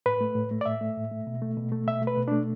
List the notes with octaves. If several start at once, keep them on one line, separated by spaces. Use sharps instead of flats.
A2 B4
A3
A2
A3
D5
A2 E5
A3
A2
A3
B2
A3
B2
A3
B2 E5
A3
B4
B2
A3 D4